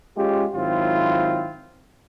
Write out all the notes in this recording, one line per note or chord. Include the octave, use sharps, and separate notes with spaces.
G#3 C#4 F4 G4
G#2 D#3 F#3 C4 E4 F4